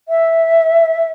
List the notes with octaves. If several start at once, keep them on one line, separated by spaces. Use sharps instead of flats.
E5